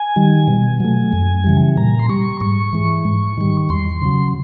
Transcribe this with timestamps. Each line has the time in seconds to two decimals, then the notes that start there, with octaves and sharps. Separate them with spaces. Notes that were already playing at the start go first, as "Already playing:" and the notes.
Already playing: G#5
0.16 D#3 G3
0.48 B2
0.80 F#3 A3
1.13 F#2
1.44 C#3 E3 G3
1.77 A#2 A#5
1.99 C6
2.09 G3 C#6
2.41 G#2 C#6
2.73 E3 G#3
3.05 G#2
3.38 D#3 G3
3.69 E2 C6
4.02 C#3 F#3